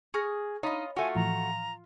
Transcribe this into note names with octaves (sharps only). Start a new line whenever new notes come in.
G#4 C#6 F6 A#6
D#4 F4 C#5 D#5 B5
A3 F4 F#4 G#5
A2 E3 F3 A#5